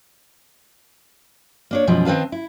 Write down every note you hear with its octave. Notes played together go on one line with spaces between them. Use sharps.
A#3 D4 C#5
F#2 B2 E3 F3 G#3
D#3 C4 B4 F5 A5
E4